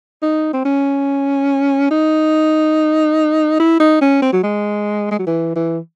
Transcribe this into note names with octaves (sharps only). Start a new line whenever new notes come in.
D#4
C4
C#4
D#4
E4
D#4
C#4
C4
F#3
G#3
G#3
F#3
E3
E3